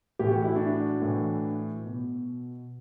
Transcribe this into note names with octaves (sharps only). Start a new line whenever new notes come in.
A2 E3 G4
F#4
E4
D4 F#4
A2 E3
B2